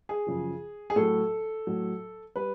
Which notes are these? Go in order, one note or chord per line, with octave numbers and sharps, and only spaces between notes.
G#4
F#2 C#3 F3
G#4
A2 F#3 A4
A2 F#3
G3 B4